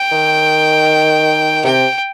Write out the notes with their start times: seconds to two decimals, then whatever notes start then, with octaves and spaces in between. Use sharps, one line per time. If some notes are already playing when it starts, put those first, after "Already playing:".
Already playing: G5
0.12 D#3
1.65 C3 G5